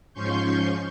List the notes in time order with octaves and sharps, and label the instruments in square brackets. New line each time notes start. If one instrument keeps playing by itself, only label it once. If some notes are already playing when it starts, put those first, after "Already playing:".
[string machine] G#2 F3 C#4 C6 C#6 G6